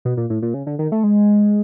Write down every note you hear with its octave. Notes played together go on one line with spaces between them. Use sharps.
B2
A#2
A2
A#2
C#3
D3
D#3
A3
G#3